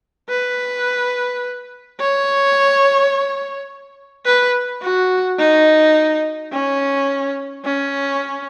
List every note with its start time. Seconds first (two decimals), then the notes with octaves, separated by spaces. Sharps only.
0.29 B4
2.00 C#5
4.26 B4
4.82 F#4
5.38 D#4
6.52 C#4
7.65 C#4